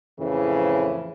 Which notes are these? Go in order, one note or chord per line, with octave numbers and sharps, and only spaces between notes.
F2 A2 C#3 E3